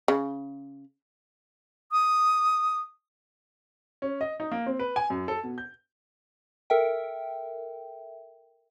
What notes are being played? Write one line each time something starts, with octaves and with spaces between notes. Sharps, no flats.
C#3
D#6
C#4
D#5
D#4
A#3
C4
B4
G#5
F#2
A4
B2
G6
A4 A#4 E5 G5